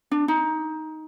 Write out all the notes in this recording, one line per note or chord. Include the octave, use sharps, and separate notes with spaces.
D4
D#4